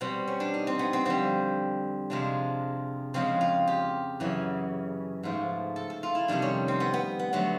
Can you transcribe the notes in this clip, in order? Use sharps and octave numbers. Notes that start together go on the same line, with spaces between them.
B2 G3 C4
C#4
D4
D#4
C4
B3
C4
F2 D3 G3 C4
F2 C3 F3 G#3 D4
F2 C#3 F3 G#3 C4
F4
G4
F#2 C#3 E3
G#2 F3 A3
A4
A4
F4
E4
F2 C3 D#3 G3 D4
C#4
C4
B3
B3
B3
D3 F#3 A3 B3